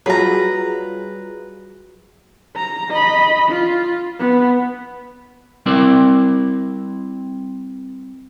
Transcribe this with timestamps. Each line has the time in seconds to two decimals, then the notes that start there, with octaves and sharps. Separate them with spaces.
0.06 F#3 G3 F4 G#4 B4 A#5
2.56 A#5
2.91 D#5 B5
3.48 F4
4.19 B3
5.66 G3 C4 E4 A#4 C5 D5